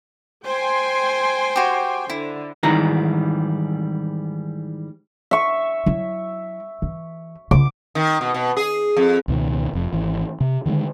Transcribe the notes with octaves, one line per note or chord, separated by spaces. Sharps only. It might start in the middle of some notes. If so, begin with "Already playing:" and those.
C5 G5 G#5 C6
F#4 G4
D3 E4
G#2 D#3 E3 G3 A#5
E5 C#6
F#3 E4
E3
C#3 F4 D6
D#3
B2
B2
G#4
F2
C#2 B2 D#3
F1 F2
G#1 E3
C3
D3 D#3 G3 G#3